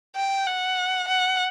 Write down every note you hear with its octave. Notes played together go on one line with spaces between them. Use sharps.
G5
F#5
F#5